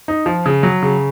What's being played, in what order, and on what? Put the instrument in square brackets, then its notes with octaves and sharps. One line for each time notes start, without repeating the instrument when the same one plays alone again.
[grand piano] D#4
F3
C#3
F#3
C#3